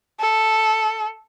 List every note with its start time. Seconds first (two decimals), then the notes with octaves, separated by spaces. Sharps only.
0.20 A4